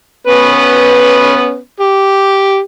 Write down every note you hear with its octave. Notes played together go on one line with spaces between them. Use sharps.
B3 C#4 B4
G4